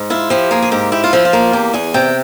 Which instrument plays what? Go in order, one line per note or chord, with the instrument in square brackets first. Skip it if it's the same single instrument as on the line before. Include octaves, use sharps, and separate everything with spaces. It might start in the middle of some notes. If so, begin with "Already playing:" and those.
Already playing: [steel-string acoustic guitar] G#2
E4 F4
F3 G4
A#3 G#4
G#4
G#2 G4
E4 G4
F4
F3 E4
F4
A#3
E2 G4
E2 G#4
C3 G5